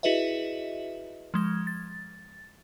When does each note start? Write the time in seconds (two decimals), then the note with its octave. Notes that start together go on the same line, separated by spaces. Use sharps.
0.03 E4 F#4 G#4 B4 D#5 E5
1.34 F3 G#3 G#6
1.67 A6